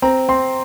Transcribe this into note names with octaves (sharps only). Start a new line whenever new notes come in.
C4 A#5
C4 C6